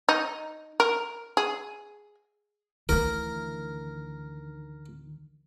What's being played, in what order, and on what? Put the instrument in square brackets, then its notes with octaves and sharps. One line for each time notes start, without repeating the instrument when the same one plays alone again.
[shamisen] D#4
A#4
G#4
[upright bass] D2 E3 [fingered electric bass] D#3 [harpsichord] A#4